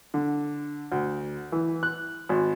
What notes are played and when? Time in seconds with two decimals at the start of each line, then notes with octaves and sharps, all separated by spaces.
0.14 D3
0.92 D2
1.52 E3
1.83 F#6
2.29 G#1